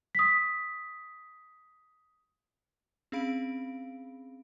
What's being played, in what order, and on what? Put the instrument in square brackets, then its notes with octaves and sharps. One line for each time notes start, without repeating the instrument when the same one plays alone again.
[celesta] D#6 B6
[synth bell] C4 C#4 G#4 F5 B5 D7